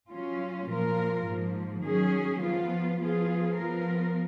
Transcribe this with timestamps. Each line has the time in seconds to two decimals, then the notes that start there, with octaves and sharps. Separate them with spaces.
0.10 F#3 C#4 F4
0.67 A#2 F3 A#3 F4 A#4
1.26 G#2 F3 A#3
1.84 D#3 F#3 C#4 G#4
2.41 F3 B3 F4
2.99 F3 B3 F4 G#4
3.57 F3 B3 F4 A#4